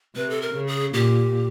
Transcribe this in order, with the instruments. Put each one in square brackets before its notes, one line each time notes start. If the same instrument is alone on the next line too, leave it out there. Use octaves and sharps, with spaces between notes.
[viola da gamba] C3 [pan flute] B4
[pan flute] A4
A#4
[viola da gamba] C#3
[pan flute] G#4
[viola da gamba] A#2 [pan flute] G4